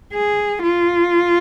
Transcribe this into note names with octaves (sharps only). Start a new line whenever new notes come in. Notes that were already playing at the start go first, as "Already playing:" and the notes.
G#4
F4